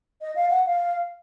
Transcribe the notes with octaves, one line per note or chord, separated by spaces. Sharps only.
D#5
F5
F#5
F5